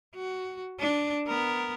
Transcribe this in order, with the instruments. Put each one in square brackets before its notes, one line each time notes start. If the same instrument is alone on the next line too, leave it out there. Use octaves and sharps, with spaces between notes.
[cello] F#4
D4
B3 A#4